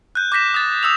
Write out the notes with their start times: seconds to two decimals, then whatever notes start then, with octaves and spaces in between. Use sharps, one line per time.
0.15 F#6 G6
0.32 D6 G6 A#6 B6 E7
0.54 D#6 A6
0.83 D#6 E6 F7